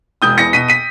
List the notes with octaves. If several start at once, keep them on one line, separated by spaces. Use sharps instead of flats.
E1 D#6 G6
E2 A#6 C#7
B2 B6 D#7
B6 D#7